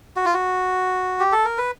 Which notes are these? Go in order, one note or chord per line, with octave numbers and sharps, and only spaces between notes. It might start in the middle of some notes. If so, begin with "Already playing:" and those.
F#4
F4
F#4
G4
A4
A#4
B4